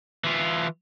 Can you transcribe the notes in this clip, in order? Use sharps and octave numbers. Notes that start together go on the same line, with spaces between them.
E3 F4